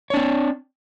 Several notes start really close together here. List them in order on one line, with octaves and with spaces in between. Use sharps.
C#5 D4 C4